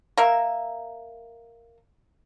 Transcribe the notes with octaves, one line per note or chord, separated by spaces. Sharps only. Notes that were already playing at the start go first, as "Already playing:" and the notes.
A#3 A#4 E5